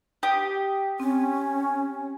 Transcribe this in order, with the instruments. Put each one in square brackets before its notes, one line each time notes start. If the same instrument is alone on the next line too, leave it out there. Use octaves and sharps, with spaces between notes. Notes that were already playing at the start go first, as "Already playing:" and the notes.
[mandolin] G4 D#6
[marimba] C4 [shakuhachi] C#4